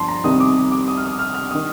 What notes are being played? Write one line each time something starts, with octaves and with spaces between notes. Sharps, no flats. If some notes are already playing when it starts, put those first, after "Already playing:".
Already playing: G1 G2 F3 A5 C6
A#5
C2 C3 D#3 D#6
D6
D6
D#6
F6
D#6
F6
F6
D#3 D#6